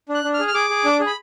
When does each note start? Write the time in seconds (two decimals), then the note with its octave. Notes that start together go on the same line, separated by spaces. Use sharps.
0.09 D4
0.14 F#6
0.24 D4
0.34 F6
0.39 G#4
0.48 F6
0.54 G#4 D6
0.70 G#4
0.84 D4
1.00 G#4
1.07 B5